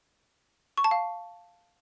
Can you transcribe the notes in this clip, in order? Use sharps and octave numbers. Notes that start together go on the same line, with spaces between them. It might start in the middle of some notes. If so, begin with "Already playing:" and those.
C#6
A5
F5